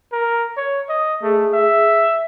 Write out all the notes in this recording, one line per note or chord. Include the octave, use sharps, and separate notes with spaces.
A#4
C#5
D#5
A3 G#4
E5